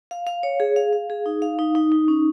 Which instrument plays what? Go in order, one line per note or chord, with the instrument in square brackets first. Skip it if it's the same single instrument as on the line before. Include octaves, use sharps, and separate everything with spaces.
[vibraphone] F5
F5
C#5
G#4
F5
F5
G#4
D#4
F5
D#4
D#4
D#4
C#4